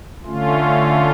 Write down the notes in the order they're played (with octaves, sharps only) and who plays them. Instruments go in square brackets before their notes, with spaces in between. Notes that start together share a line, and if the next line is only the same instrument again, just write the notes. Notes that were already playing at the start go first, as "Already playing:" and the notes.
[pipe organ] D3 A3 C#4 F4